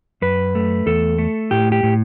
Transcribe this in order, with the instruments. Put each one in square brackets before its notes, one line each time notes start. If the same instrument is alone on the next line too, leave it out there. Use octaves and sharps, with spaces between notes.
[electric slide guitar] F#2 B4
A3
E2 A4
A3
A2 G4
G4
A2